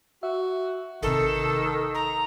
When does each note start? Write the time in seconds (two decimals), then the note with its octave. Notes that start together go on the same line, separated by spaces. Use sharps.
0.23 F#4 E5
1.03 G#1 C3 D#3 A4
1.95 A#5